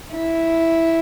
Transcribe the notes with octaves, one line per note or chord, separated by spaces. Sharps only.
E4